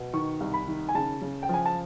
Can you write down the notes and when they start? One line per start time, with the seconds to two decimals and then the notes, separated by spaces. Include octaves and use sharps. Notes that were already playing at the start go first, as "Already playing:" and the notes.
Already playing: B2
0.13 D#3 C#6
0.40 C2
0.54 B5
0.68 D#3
0.89 G#5
0.95 C#3 A5
1.22 C#3
1.43 G5
1.49 F3 G#5
1.66 A5